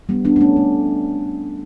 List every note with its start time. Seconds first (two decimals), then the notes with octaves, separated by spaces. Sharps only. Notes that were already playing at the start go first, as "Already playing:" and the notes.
0.09 G3 B3
0.25 B3 D4
0.36 D4
0.41 A3 C#4
0.56 A3